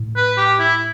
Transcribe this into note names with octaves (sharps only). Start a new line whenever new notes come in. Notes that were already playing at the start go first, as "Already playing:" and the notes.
Already playing: A2
B4
G4
E4